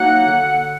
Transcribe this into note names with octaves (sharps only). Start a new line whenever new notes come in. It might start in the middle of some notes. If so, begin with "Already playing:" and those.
Already playing: F#3 A#3 D#4 F#5
D3